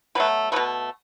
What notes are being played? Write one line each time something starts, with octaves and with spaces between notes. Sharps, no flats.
B2 F#3 A3 B4
B2 F#3 A3 B4